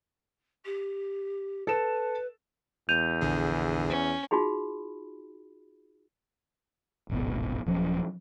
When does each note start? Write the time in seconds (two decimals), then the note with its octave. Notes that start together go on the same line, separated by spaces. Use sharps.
0.65 G4
1.67 A4 B4 E7
2.89 E2 G6 D#7 F7
3.21 A#1 D3 G#4
3.90 C#4
4.31 D#4 F4 F#4 G#4 B5
7.09 D1 G#1 B2
7.66 D#1 F3 F#3 C#4